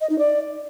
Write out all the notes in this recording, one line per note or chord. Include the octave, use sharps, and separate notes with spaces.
D#5
D#4
D5